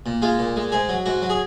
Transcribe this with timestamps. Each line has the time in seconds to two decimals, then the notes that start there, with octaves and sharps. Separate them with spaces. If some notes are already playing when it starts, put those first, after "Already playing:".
0.06 A#2
0.22 G#3 F4
0.39 A#2
0.56 G#3
0.72 G#2 G#4
0.89 F#3
1.06 G#2 F#4
1.22 F#3
1.30 G#4